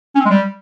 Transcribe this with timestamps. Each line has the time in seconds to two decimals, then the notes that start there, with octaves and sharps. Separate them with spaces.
0.15 C#4
0.20 C4
0.25 G#3
0.31 G3